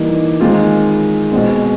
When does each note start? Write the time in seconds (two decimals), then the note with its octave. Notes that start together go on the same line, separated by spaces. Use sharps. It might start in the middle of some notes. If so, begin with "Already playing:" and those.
Already playing: E3 G3 A#3 D#4
0.41 D#3 G#3 C4 F4
1.32 B2 G#3 C4